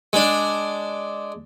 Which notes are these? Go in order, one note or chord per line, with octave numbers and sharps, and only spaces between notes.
G#3 D4